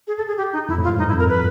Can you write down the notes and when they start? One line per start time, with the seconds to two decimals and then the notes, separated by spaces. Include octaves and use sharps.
0.07 G#4
0.17 A4
0.27 G#4
0.38 G4
0.53 D#4
0.68 F2 E4
0.78 A2
0.84 F4
0.89 G#2
0.99 G2 D#4
1.08 E4
1.14 F2
1.19 A#4
1.29 B4